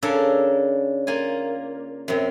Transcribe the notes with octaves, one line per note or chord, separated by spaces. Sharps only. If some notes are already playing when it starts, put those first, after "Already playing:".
C#3 D4 A4 A#4
A#3 F4 G#5
F#2 C3